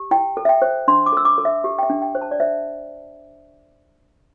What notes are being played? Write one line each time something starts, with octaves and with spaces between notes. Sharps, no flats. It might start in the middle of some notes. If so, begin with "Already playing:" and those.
Already playing: G4
E4 G5
A4
E5
G5
C5
D4 C6
D6
A4 E6
D6
A4
E5
G4
G5
E5
D4
G5
C5
A5
D5
C5 E5